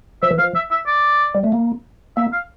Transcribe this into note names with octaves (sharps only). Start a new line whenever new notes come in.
F3 E5
E3
F3 F5
E5
E5
D5
G3
A3
A#3
A#3 E5
F5